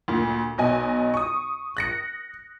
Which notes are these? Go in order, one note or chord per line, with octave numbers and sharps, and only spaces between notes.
D2 A#2
B1 B2 D#5 G#5
C#6 D#6
F#6 A#6 C#7